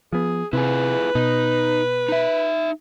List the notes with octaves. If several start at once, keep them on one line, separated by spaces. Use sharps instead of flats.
F3 B3 G#4
C3 E4 F4 G#4 B4
B2 D#4
D#4 E5